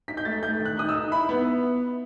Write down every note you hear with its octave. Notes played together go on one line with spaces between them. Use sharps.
D#4 B6
G6
A3 A6
A3 G6
D#3
F#6
D#4 D#6
E6
D#4
E4 B5
B3